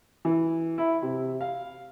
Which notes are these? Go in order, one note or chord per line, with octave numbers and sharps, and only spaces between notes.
E3
E4
C3
F5